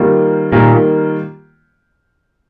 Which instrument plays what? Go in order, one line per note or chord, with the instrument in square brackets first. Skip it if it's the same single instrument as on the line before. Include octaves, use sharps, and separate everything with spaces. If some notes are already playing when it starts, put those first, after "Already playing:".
Already playing: [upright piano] D#3 G3 A#3 F4
[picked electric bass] A#2 [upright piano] D#3 G3 A#3 F4